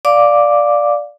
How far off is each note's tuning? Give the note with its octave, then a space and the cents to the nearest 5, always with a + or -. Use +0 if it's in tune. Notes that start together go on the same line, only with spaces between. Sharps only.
D5 +0 F5 +10 D6 +0